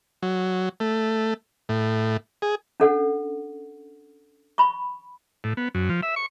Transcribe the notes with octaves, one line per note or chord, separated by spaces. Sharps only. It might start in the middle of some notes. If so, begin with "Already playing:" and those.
F#3
A3
A2
G#4
C#4 D4 A4 F#5
B5 C#6
A2
B3
F#2
F3
E5
C#6